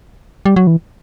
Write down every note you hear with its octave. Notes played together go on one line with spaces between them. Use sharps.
G3
F#3
E3